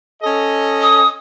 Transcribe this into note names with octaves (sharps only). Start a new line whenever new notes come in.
C#4 A4 D#5
D#6